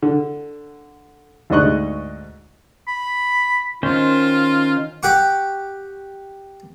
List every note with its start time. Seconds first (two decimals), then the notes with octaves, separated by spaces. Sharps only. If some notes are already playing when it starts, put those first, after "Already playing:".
0.02 D3
1.50 D2 G#2 D4 D#5 C#6 F#6
2.87 B5
3.83 D#3 C#4 F4 C5
5.03 G4 F#5 C#6